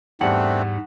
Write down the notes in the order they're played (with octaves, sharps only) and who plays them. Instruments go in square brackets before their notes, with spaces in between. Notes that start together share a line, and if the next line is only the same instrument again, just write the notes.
[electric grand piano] E2 G3 [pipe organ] G#2 [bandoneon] A3 C4 D4 [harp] F#5